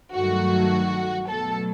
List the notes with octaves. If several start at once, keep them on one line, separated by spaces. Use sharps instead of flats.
G2 D#3 F#3 A3 F#4
B2 F#3 A3 A4